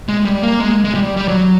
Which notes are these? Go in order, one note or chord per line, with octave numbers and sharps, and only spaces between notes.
G#3
G3
A#3
G#3
G#3
G3
G3
F#3